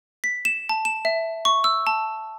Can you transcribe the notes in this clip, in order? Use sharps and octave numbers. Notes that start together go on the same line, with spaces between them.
B6
E7
A5
E7
E5
C#6
E6
A5